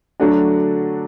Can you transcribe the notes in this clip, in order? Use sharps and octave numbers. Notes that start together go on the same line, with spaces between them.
D3 F#3 A3 D4 F#4